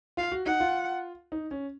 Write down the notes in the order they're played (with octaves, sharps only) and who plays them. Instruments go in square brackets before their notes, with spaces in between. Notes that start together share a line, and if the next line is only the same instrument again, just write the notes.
[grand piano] F4 [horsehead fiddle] F5
[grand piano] F#4
[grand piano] D#4 [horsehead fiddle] F#5
[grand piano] F4
D#4
C#4